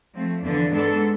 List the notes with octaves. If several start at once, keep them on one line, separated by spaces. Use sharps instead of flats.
F3 A3 C4
E2 D3 F3 B3 D4
G#2 G#3 B3 D4 A4